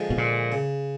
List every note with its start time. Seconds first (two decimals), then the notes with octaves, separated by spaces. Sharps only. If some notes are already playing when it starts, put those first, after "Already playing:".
Already playing: D3 F3 G#3
0.10 B2
0.18 A#2
0.52 C#3